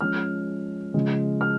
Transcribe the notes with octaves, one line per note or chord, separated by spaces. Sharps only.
F3 G#3 C#4 F6
C#3 F3 G#3
F6